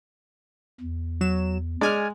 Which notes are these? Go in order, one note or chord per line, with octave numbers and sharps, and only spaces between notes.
E2
F#3 E7
G#3 D5 G#5 F6